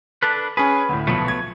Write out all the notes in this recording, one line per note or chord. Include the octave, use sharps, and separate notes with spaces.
D4 A4 B4
C#4 G#4 B4
D2 A2
B1 F3 A3 B3
G#6